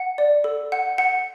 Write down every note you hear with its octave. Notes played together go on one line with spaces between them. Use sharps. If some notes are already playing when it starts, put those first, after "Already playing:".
Already playing: F#5
D5
A4
F#5
F#5